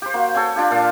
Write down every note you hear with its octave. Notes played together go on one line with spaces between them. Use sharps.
G4 C5
A#3 F#4
A4 C#5 G5 G#5
D4 F4 G4
A#2 F5 A5